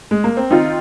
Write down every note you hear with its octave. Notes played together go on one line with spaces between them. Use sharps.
G#3
A#3
C4
D#3 C4 D#4 F4